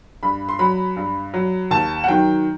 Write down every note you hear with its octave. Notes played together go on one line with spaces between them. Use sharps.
G2 B5
C6
F#3 B5
G2
F#3
D#2 A5
F#5
D#3 F#3 G5